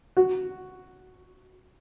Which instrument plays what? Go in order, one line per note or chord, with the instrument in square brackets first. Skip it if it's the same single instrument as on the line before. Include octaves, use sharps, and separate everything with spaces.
[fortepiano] F#4